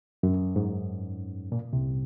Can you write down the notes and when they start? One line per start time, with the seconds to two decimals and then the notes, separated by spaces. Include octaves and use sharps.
0.23 F#2
0.56 G#2
1.52 A#2
1.73 C2 C3